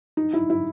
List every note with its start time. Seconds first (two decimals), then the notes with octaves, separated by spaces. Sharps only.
0.17 D#4
0.33 E4
0.50 E4